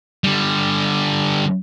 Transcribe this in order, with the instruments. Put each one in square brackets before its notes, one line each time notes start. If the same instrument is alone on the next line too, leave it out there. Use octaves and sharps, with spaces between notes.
[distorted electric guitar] D3 G3